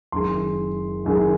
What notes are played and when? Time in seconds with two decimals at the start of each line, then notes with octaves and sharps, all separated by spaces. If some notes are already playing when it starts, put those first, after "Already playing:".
0.12 F#1 F#2 D#3 G#3 C6
1.05 F#1 F#2 D#3 G#3